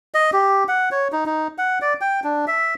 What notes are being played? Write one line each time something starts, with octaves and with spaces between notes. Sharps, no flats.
D#5
G4
F#5
C#5
D#4
D#4
F#5
D5
G5
D4
E5